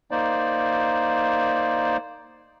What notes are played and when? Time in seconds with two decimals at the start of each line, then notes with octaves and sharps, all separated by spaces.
0.11 A#3 D#4 C5 D5